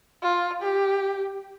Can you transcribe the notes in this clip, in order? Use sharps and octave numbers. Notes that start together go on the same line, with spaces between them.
F4
G4